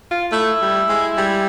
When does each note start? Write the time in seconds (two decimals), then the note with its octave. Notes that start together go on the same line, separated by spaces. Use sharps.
0.11 F4
0.32 A3 E4
0.61 G3
0.89 G#3
1.18 G3